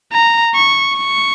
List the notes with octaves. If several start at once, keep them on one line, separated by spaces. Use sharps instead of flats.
A#5
C#6
C#6